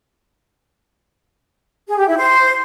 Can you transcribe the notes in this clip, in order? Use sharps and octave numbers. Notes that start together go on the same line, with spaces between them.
G#4
G4
E4
C5